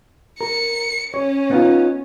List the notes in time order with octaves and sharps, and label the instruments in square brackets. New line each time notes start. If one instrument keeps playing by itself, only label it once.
[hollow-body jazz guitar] A#4 [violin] C#7
[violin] C#4 [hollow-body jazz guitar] C#5
[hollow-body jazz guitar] B3 D#4 F4